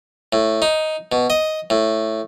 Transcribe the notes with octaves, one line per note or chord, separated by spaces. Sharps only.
A2
D#4
B2
D#5
A2